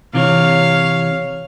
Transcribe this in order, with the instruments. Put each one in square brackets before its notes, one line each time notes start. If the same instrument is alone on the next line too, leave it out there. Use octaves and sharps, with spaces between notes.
[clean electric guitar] C3 E3 [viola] C#5 F5